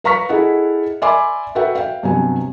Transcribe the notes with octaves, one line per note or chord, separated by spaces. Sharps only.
B4 F5 A#5 C#6 F6 B6
E4 G#4 A4 D#5 F#5
D5 E5 G#5 B5 C6 D6
F#4 A4 B4 E5 F#5 G5
F5 G5
G2 C3 F#3 B3 G#5